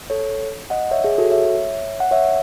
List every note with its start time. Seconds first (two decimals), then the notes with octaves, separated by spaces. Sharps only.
0.10 A4 C#5
0.70 D#5 F#5
0.91 C#5 E5
1.04 G#4
1.18 F#4 A4
1.31 C#5 E5
2.00 F#5
2.11 C#5 E5